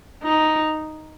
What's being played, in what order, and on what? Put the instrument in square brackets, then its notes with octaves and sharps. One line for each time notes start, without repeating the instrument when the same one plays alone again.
[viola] D#4